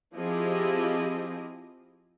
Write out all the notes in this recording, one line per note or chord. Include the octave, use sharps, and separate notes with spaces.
F3 C4 E4 G4 G#4 D#5